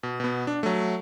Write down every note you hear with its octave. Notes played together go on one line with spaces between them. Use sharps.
B2
B2 B3
D4
F#3 A3